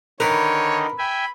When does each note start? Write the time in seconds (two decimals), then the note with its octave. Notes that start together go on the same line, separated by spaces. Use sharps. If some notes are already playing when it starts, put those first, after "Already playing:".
0.20 D3 D#3 D#4 A#4 B4 C#5
0.99 E5 G5 G#5 B5